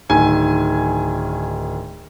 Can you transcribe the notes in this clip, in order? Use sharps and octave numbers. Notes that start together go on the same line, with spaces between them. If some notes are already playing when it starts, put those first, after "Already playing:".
D1 D#3 G#5